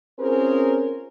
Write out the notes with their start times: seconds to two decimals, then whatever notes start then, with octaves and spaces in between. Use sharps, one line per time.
0.19 C4 C#4 F4 G#4 A#4 C5